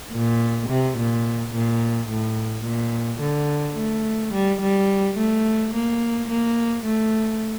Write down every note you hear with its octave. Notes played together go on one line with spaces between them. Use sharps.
A#2
C3
A#2
A#2
A2
A#2
D3
A3
G3
G3
A3
A#3
A#3
A3